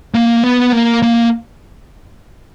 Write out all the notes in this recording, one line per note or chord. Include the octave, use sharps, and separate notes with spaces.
A#3
B3
A#3
A#3